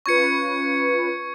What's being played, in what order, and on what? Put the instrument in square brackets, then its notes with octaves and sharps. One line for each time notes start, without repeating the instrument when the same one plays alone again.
[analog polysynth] C#4 F4 B4 [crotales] C#6 G#6 C#7